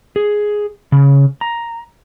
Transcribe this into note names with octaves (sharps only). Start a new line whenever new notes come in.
G#4
C#3
A#5